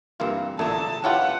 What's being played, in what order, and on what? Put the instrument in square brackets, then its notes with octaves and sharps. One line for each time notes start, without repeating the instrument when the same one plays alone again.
[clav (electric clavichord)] G2 A#3 F4 [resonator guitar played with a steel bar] E3 C4
[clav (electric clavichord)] A1 A#2 A3 [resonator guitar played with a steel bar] D3 F#3 G#4 [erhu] A5
[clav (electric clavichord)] C#4 E4 F4 [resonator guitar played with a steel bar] G4 B4 G5 [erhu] F#5